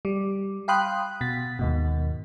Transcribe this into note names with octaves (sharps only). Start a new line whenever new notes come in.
G3
F5 G5 B5 C6 D#6 F#6
B2 A6 B6
D#2 G#2 B2